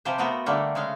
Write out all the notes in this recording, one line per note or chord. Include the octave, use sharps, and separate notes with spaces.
C3 F3 G4 B4 C5
A3 B3 F4 F#4 A#4 D#5
D3 G3 A3 A#3
C#3 G#3 A3 F5